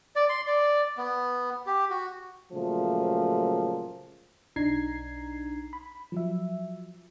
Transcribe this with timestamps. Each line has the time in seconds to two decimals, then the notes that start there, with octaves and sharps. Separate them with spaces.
0.16 D5
0.29 C6
0.47 D5
0.97 B3
1.66 G4
1.90 F#4
2.52 A#2 C#3 F3 F#3 A3
4.56 B1 D4 D#4 A#5 G#6 C7
5.73 B5
6.12 F3 F#3 E5